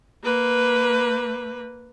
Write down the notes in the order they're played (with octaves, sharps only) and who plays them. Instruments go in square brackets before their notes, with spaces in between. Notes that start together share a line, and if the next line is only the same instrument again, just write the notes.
[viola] A#3 B4